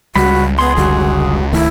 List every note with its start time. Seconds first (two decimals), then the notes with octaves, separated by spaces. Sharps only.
0.16 C#2 G3 F#4 B5
0.59 B3 G#4 C6
0.77 F1 D3 G3 F#4
1.52 D1 D#3 A3 E4